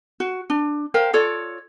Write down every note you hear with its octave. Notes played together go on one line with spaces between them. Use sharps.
F#4
D4
A#4 C5 F5 G5
F4 A4 C#5 D5